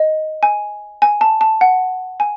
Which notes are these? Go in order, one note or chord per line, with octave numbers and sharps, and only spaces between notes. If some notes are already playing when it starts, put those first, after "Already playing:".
Already playing: D#5
G#5
G#5
A5
A5
F#5
G#5